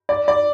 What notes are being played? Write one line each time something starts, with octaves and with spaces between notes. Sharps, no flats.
D5
D5